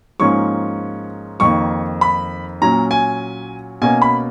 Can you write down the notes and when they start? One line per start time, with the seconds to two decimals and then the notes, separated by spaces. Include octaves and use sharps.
0.20 G#2 F3 A#3 C#4 C#6
1.40 F2 D#3 A#3 C#6
2.01 B5
2.62 A#2 F#3 C#4 A#5
2.91 G#5
3.82 B2 A#3 C#4 G#5
4.02 B5